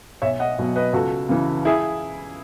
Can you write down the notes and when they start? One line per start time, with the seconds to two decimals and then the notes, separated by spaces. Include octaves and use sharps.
0.22 B1 C#5 E5
0.40 D#5 F#5
0.58 B2 F#3
0.76 B4 D#5
0.93 C#2 F#4 A4
1.29 C#3 E3
1.65 E4 G#4